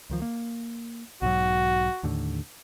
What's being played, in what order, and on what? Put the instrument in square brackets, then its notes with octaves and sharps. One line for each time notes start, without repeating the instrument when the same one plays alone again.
[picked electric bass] C#2 D#3 F3
A#3
[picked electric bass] B1 G#2 F#3 [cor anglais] F#4
[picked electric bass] D#2 A2 D3